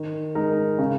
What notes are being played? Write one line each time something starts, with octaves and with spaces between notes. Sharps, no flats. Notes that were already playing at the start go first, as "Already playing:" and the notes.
Already playing: D#3
G#3 D#4 A#4
C#3